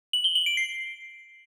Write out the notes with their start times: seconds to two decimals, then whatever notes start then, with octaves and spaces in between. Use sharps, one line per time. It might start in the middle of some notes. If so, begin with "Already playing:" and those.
0.13 F#7
0.24 G7
0.35 F#7
0.46 D7
0.57 C7